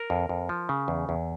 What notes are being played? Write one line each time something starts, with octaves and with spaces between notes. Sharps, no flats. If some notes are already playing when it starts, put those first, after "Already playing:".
Already playing: A#4
F2
F2
F3
C#3
E2
E2